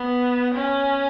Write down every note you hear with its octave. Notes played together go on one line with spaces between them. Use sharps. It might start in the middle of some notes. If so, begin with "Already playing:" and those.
Already playing: B3
C#4